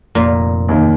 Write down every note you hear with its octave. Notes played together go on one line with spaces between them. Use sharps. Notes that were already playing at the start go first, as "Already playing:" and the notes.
F1 A#2
D#2 D#3